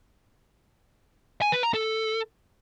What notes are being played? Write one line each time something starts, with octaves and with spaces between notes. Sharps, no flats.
G#5
B4
A#5
A4